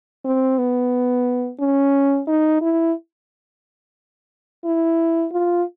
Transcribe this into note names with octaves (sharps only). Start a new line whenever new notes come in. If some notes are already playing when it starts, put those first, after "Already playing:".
C4
B3
C#4
D#4
E4
E4
F4